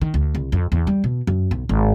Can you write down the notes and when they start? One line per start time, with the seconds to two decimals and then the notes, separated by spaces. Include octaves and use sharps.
0.01 D#3
0.14 D2
0.35 C2
0.52 F2
0.72 E2
0.87 G3
1.04 B2
1.27 F#2
1.51 B1
1.69 G#1